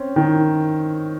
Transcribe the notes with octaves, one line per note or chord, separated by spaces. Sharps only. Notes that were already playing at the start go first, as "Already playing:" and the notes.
Already playing: C4 C#4
D#3